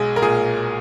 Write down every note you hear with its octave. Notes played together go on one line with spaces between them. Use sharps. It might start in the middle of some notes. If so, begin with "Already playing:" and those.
Already playing: B1 G#3 G#4
A#4
A#2 G#4